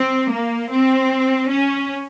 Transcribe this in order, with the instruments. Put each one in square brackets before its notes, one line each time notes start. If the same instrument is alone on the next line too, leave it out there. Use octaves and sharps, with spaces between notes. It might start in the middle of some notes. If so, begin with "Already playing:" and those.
Already playing: [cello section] C4
A#3
C4
C#4